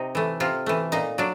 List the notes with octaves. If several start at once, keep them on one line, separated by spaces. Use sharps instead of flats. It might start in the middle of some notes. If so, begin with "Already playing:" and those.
Already playing: C3 D#4
E3 A3
C3 F4
E3 A3
A#2 D#4
F#3 D4